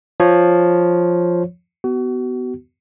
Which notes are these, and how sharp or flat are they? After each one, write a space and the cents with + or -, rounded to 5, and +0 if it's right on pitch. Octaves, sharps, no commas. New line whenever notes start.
F3 +0 C#5 +0
B3 +15 F#4 +35